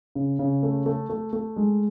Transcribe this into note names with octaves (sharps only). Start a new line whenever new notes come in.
C#3
C#3
A3
A3
A3
A3
G#3